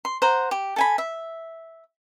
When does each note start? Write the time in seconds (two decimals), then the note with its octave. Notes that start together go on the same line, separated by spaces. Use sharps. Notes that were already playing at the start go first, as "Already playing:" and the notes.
0.05 C6
0.22 C5 F#5 A#5
0.51 G4
0.76 A4 G#5 B5
0.98 E5